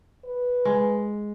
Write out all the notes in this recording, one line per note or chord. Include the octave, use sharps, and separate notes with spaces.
B4
G#3